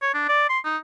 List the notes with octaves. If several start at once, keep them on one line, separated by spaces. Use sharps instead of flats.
C#5
D4
D5
C6
D#4